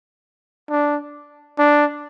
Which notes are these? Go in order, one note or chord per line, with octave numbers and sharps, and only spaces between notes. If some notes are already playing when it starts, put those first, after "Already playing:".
D4
D4